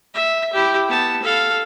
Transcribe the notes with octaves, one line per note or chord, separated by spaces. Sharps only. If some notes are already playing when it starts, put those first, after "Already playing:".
E5
E4 G4
B3 A5
A4 F5